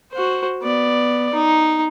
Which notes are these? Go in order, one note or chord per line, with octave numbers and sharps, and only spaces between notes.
F#4 C5
B3 D5
D#4